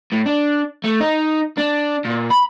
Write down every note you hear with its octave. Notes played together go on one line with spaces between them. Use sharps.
A2
D4
A3
D#4
D4
A#2
B5